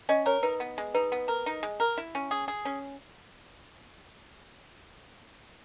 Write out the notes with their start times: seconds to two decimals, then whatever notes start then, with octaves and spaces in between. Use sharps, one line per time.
0.09 C#4 D#5
0.26 A#4 C#5
0.43 D#4 B4
0.60 B3
0.78 G#3
0.94 D#4 B4
1.12 B3
1.28 A#4
1.46 D#4
1.63 G#3
1.80 A#4
1.98 E4
2.15 C#4
2.31 G#4
2.48 G#4
2.65 C#4